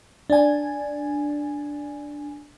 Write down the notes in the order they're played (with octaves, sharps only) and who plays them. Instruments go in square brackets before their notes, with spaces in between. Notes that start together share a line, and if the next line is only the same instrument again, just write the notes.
[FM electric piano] D4 G#5